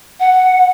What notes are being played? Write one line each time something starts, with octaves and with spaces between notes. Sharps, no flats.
F#5